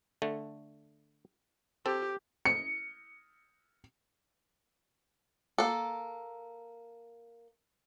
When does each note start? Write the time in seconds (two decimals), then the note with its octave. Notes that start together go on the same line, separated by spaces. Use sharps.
0.22 D3 A3
1.86 C4 G4 A4
2.45 C#7
5.58 A#3 A4